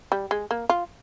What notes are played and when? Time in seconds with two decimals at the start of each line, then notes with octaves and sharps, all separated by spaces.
0.12 G3
0.31 G#3
0.51 A#3
0.69 F4